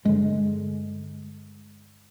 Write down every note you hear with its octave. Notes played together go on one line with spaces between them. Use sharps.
G2 D3 G#3